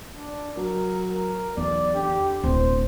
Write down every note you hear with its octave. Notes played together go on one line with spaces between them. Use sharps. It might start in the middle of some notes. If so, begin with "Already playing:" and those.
D4
F#3 A#4
A#4
B1 E2 D5
D3 G4
D1 B2 C5